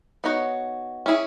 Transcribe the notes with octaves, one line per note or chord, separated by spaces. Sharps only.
B3 D#4 F#4 C#5
C#4 E4 G#4